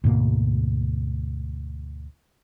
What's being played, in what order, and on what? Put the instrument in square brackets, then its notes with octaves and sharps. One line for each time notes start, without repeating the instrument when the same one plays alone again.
[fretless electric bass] D2 G#2 B2 A#3